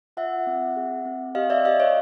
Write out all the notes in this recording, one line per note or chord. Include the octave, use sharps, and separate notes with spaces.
F4 E5 F#5
C4
G#4
C4
G4 D#5 F5
D5 E5
G4 D#5 F5
C#5 D#5